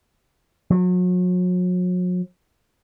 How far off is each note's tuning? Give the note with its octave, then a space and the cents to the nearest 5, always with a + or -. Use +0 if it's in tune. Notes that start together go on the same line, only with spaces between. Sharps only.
F#3 -40